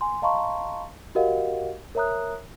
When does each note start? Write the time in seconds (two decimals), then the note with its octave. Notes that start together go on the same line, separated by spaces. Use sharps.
0.01 G#5 C6
0.22 D#5 F5 A5 A#5 C6 C#6
1.15 F#4 G4 A#4 D#5 F5 F#5
1.95 A#4 C#5 E5 A#5 D#6 F#6